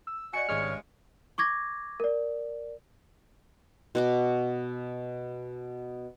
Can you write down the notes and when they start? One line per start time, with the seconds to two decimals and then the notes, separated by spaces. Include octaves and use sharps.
0.07 E6
0.33 F#4 D5 D#5 G#5 C#7
0.49 G#1 G2 C#3 G#3 C#5 F6
1.38 C#6 D6 G#6 A#6
2.00 A#4 D5
3.95 B2 F#4 D6